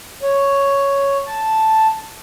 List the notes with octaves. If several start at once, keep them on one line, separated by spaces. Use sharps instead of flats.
C#5
A5